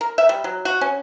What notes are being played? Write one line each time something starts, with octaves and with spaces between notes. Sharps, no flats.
A#4
E5
G3
F#3
F#4
C#4